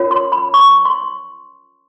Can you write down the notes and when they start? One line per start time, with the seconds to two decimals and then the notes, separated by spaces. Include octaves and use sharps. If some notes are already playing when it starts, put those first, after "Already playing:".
Already playing: C#4 F4 A#4 C#5
0.11 C6
0.32 B5
0.54 C#6
0.85 C6